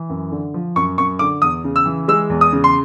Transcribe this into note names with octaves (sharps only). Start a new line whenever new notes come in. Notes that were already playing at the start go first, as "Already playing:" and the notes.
Already playing: E3
F#2
D3
F3
F#2 C#6
F#2 C#6
D3 D6
E2 D#6
C#3
E6
E3
G#3 E6
E2
D#6
C#3
C6